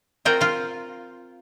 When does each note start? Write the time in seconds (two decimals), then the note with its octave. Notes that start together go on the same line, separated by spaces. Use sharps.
0.25 C4 F4 F#4 A#4 G5
0.41 F4 F5